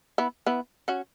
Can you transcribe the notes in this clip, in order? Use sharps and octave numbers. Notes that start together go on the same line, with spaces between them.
B3 E4
B3 E4
C#4 F#4